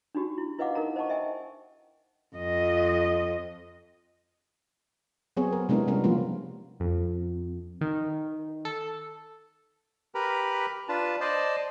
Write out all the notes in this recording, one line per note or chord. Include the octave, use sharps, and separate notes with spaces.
D4 D#4 F#4 G4
E4
E4 B4 D#5 F5 F#5 D6
D#4 A#4 F5 A#5
C5 D#5 F#5 A5 C#6
D#5 E5 G5 G#5
F2 D#5
F#3 B3 C4 G#4 C#5
A#4
C3 G#3 B3 D4 E4 A#4
C3 G3 B3 C#4 A#4
F3 A#3 F4
F2
D#3
A4
G4 A#4 B4 A#5 B5
D4 F4 B4 A5
C5 D5 D#5 A5